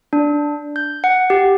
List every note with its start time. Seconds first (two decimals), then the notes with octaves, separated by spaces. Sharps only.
0.13 D4
0.76 G6
1.04 F#5
1.30 G4